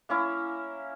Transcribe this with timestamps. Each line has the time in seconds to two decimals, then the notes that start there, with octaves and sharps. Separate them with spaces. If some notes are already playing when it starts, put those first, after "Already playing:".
0.09 A#3 C#4 E4